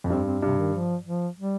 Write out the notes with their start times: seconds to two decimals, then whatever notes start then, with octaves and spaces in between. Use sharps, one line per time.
0.04 F2
0.10 G2 C4
0.27 C4
0.42 G2 C3
0.58 D#3
0.74 F3
1.06 F3
1.39 G3